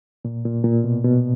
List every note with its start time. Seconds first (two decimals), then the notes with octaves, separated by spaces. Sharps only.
0.25 A#2
0.45 A#2
0.64 A#2
0.84 B2
1.04 B2